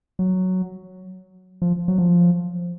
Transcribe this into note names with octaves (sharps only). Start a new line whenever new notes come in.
F#3
F3
F#3
F3